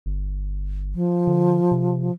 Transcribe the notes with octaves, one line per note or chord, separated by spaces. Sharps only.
G1
F3
D3
C3